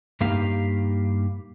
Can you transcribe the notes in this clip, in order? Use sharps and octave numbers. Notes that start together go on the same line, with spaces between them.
G2 A#3 D#4 G4 F5